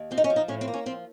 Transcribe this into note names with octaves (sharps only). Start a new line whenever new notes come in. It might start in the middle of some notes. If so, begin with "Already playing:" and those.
Already playing: D#2
F3 C4
D#4
C#4
F3
D#4
A2 C#4
C4
A#3
C#4
F3 C4